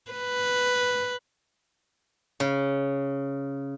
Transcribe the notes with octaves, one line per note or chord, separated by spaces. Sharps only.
B4
C#3